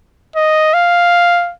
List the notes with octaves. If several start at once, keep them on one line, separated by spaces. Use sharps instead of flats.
D#5
F5